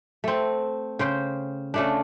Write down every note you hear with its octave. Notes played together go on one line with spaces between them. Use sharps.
A3 C4
C#3 C5 G5
C#3 A3 D4